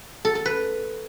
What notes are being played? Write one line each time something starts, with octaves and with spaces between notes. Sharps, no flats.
A4
A4
B4